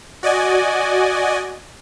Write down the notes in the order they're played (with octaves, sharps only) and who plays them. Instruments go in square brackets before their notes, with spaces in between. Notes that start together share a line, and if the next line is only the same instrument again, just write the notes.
[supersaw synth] F#4 D5 D#5 G#5